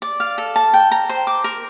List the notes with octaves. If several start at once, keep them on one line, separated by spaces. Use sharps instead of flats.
D5
F5
A4
A5
G5
A#5
C5
D6
A#4